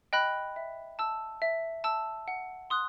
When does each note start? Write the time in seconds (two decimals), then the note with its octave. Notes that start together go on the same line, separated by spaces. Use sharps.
0.13 D#5 G5 B5 F#6
0.56 E5
0.99 A5 E6
1.42 E5
1.84 A5 E6
2.28 F#5
2.70 C6 D#6 F#6